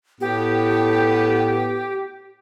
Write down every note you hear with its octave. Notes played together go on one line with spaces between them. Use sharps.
A2 B3 G4